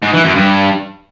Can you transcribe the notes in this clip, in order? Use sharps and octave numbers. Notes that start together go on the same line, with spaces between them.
G#2
E3
F#2
G2